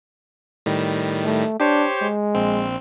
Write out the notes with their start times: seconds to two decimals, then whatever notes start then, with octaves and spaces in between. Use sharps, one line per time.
0.66 A2 D#3 G3
1.25 A3
1.60 D4 G4 C5 C#5
2.02 G#3
2.35 A#1 C4